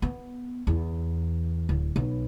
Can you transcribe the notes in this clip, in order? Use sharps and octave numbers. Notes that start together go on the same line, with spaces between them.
B3
E2
D1
B1